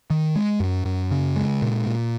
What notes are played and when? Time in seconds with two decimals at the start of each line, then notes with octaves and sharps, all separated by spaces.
0.10 D#3
0.36 G#3
0.60 F#2
0.85 F#2
1.11 C#3
1.36 G#3
1.62 A#2
1.87 A#2